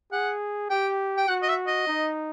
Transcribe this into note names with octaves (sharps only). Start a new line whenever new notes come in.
G#4 F#5
G4 G5
G5
F#4 F#5
D#5
E5
D#5
D#4